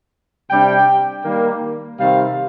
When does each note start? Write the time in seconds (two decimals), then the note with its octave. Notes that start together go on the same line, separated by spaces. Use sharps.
0.50 C3 G3 D4 G5
1.25 D#3 G3 A#3
1.99 C3 D#3 G3 C4 F5